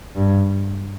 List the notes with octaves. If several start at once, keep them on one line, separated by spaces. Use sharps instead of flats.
G2